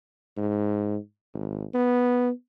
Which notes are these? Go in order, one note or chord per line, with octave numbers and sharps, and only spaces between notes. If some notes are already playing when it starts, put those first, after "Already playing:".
G#2
G#1
B3